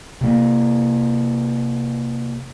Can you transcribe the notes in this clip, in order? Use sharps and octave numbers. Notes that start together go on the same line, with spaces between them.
C3 A#3